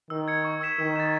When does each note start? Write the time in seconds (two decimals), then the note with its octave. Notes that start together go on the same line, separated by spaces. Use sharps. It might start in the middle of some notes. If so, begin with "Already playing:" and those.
0.10 D#3 E6
0.28 G#6 C#7
0.45 C#6
0.61 E6 B6 E7
0.79 D#3 E6
0.96 A6 E7